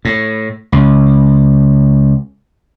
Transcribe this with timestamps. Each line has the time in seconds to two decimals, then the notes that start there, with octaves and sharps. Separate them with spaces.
0.05 A2
0.72 C#2